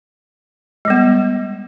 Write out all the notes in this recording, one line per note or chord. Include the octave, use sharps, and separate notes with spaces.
G3 G#3 B3